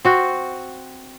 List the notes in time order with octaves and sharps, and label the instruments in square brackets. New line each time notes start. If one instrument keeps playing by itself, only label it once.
[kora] C4 F#4